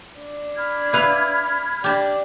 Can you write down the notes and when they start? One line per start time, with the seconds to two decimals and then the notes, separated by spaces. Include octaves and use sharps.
0.20 D4
0.57 B5 F6 G#6
0.93 E4 B4 F5
1.84 D4 G4 A5